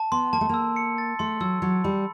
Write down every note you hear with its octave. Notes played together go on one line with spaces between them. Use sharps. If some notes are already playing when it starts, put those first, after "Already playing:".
Already playing: A5
B3 C6
A#3 A5
A3
A#3 E6
C#7
A6
A3 C6
F#3 E6
F#3 C#7
G3 B5